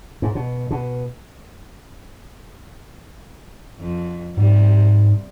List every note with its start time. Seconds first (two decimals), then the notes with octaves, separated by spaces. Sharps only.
0.22 G#2
0.35 B2
0.71 B2
3.79 F2
4.37 G#2 C3 G3